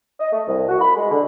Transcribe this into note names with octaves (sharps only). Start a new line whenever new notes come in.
D#5
A3
C2
F#4
B5
G#3
D3